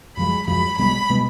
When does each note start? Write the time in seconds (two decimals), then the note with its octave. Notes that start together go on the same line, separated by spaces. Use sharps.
0.16 F#2 F3 G#3 B5
0.47 F#2 F3 G#3 B5
0.78 B1 B2 G#3 B3 B5
1.10 B2 G#3 B3